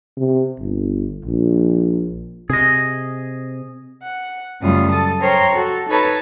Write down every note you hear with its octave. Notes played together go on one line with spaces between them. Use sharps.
C3
G1
A#1
C3 G#4 D#5
F#5
F#2 C#3 G3 A3 F4 D#6
A4 A5 D#6
A#4 C5 C#5 G5 A#5 C6
F#4 A4
D#4 A4 B4 C#5 A5